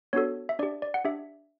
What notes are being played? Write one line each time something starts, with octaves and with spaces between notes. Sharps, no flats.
B3 D4 F#4 A4 C#5
E5
D4 G4 D5
D5
F#5
D4 G4 E5